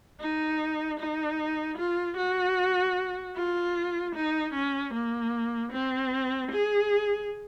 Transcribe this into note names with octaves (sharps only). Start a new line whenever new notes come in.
D#4
D#4
F4
F#4
F4
D#4
C#4
A#3
C4
G#4